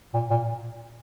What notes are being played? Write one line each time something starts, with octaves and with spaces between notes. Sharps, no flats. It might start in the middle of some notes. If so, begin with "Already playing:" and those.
A#2
A#2